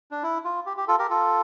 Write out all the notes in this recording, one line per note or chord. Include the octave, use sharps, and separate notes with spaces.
D4
E4
F4
G4
G4
F4 A4
G4 A#4
F4 A4